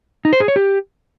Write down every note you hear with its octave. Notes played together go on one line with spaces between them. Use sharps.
D#4
C5
G#4
C#5
G4